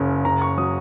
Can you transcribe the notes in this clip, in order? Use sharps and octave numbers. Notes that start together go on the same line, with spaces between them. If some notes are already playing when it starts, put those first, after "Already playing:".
Already playing: F#1 C#3
F#1 A#5
C#6
F#3 D#6